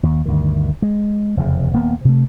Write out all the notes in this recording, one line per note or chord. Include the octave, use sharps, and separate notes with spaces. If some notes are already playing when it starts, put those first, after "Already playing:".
D#2
D2 G2 D#3
G#3
F1 E2 C#3
D#1 A#3 B3
C3 A3